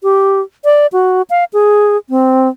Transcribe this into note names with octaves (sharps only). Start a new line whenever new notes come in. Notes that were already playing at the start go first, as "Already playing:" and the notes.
G4
D5
F#4
F5
G#4
C4